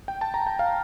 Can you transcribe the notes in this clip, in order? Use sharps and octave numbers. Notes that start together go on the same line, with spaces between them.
G5
A5
A#5
G5
F5